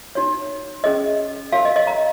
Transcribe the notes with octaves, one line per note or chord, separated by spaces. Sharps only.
D#4 F#4 C#5
C#4 G#4 C#5 D#5
F#4 A#4 C#5 F5
D#5
D#5
A#5